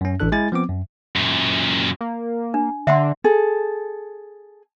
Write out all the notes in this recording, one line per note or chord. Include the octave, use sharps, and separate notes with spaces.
F#2 C#4
A1 E3 D4 A4 F#6
G#3 E4 G#5 A6
F3 B3 C4 D6
F#2
F#2 A#2
A#3
D4
D3 E5 F#5 C6
G#4 A4